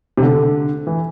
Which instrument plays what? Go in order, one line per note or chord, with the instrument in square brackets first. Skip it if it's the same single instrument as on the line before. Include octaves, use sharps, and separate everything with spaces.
[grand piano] C3
D3
E3